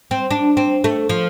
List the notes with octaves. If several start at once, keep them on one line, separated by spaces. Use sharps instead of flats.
C4
D4
C4
A3
F3